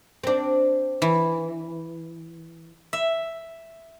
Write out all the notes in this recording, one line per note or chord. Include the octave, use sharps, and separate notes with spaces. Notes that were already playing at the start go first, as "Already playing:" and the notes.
C4 D4
E3
E5